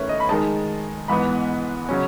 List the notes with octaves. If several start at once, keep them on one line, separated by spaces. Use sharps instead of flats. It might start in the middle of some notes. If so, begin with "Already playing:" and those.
Already playing: D#3 A3 C#4 E4 B4 C#5
D#5
B5
D#3 G#3 D#4 A5
G#2 E3 B3 B5
C#3 F#3 C#4